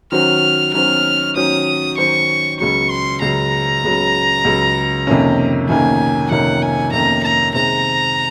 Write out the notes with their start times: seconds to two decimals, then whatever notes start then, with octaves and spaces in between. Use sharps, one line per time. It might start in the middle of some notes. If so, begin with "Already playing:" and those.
0.12 D#3 F#3 C#4 F#4 C5 F6
0.74 D#3 F#3 C#4 F#4 C5 F6
1.36 D#3 F#3 C#4 F#4 C5 D#6
1.98 D#3 F#3 C#4 F#4 C5 C#6
2.60 C#2 C#3 F#3 C#6
2.90 C6
3.22 C#2 C#3 F#3 A#5
3.84 C#2 C#3 F#3
4.45 C#2 C#3 F#3
5.07 F2 C3 D#3 A#3 C#4
5.69 F2 C3 D#3 A#3 C#4 G#5
6.31 F2 C3 D#3 A#3 C#4 F#5
6.62 G#5
6.93 F2 C3 D#3 A#3 C#4 A#5
7.24 A#5
7.54 C3 D#3 G#3 C4 A#5